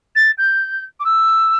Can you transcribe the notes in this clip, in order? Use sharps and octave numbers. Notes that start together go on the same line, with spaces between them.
A6
G6
D6
E6